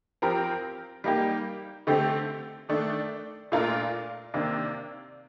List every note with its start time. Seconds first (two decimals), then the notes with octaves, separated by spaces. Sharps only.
0.22 F3 C4 G4 A#4
1.04 G3 A#3 D#4 G4
1.87 D3 A3 C4 G4
2.69 D#3 A3 D4
3.52 A#2 A3 D4 F4 A#4
4.34 C3 D#3 A#3 D4